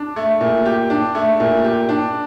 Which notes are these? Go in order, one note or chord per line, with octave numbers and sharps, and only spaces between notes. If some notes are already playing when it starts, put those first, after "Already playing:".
Already playing: D4
A3
A#2
G4
D4
A3
A#2
G4
D4